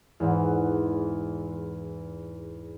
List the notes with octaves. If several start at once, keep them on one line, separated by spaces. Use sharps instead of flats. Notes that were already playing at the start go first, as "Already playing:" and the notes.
E2 G#2 E3